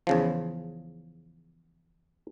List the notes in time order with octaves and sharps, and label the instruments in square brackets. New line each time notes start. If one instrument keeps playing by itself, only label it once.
[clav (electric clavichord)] E2 C#3 F3